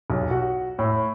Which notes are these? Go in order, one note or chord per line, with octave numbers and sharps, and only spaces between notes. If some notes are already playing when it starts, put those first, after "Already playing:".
B1
F#4
A2